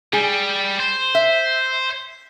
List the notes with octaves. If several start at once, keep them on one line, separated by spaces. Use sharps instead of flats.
G3 G#4
C5
E5